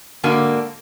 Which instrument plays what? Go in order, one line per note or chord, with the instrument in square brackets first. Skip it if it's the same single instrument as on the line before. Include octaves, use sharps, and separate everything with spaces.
[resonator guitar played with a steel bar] G#2 D3 A#3 F#4